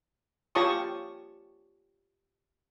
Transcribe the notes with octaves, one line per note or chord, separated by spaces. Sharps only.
F4 G4 C#5 A5 C#6 D#6